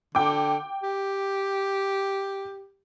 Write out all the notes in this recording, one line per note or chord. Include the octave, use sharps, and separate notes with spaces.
D3 G5 D6
G4